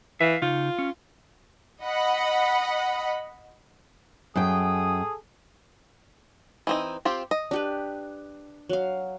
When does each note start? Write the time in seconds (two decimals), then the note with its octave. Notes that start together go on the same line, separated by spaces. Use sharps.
0.21 E3 E5 F5
0.42 C#3 D#4 F4
0.79 C#4
1.82 D#5 F#5 B5
4.36 F#2 G#4 A4 G5 D#6
6.67 E3 C4 D#4
7.05 C4 F4 G4
7.31 D#5
7.51 D4 G4 B4
8.69 F#3 F5